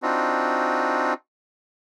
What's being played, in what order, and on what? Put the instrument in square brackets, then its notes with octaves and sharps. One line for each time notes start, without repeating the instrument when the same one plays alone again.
[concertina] C4 D4 D#4 F4 F#4